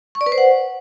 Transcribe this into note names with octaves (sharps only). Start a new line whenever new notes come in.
C#6
D5
B4
C5
F#5